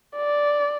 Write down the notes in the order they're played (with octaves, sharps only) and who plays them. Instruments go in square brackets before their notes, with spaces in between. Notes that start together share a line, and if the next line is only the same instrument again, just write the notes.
[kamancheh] D5